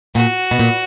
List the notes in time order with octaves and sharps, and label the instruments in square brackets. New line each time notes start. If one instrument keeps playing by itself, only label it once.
[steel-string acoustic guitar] A#2 [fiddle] F#4
[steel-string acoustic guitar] B2
A#2